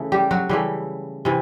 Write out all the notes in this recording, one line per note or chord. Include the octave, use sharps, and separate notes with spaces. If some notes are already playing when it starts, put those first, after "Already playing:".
Already playing: C#3 E3 A3
G3 G4
F#3 F#4
C#3 E3 G3 A3 G4
C3 E3